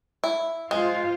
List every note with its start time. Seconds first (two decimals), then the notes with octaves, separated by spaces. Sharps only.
0.24 E4
0.71 G#3 F4 C5 F5